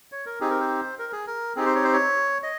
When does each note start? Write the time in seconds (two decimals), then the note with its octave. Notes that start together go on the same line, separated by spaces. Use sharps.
0.12 C#5
0.26 A#4
0.40 C4 D#4 G4 G#4
0.50 A#4
0.60 C5
0.99 A#4
1.12 G#4
1.27 A#4
1.56 C4 D#4 G4 G#4
1.66 C5
1.75 C#5
1.84 C5
1.93 C#5
2.43 D#5